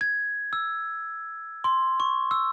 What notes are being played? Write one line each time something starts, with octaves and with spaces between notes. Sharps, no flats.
G#6
E6
C6
C#6
E6